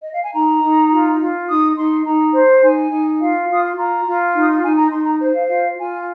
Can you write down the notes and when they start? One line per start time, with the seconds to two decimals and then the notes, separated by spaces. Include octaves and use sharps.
0.02 D#5
0.12 F5
0.23 G#5
0.33 D#4 A#5
0.63 D#4
0.90 F4
1.20 F4
1.48 D#4 D#6
1.76 D#4 C6
2.05 D#4 A#5
2.33 C5
2.62 D#4 G#5
2.91 D#4
3.19 F4 F5
3.49 F4 D#6
3.64 C6
3.76 F4 A#5
4.05 F4
4.34 D#4
4.41 D#6
4.48 C6
4.63 D#4 G#5
4.77 A#5
4.91 D#4 C6
5.06 A#5
5.20 C5
5.34 F5
5.48 F4 F5
5.78 F4 G#5